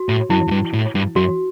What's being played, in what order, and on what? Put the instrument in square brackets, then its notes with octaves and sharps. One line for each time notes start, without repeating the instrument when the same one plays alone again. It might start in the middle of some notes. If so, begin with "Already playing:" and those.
Already playing: [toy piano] F#4
[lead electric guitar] A2
[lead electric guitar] F#2 [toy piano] E4
[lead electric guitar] F#2
G2
A2
G2
[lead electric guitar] F#2 [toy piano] F#4